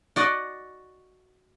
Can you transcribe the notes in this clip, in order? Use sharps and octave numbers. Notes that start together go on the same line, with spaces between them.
F#4 D5 D#5 F#5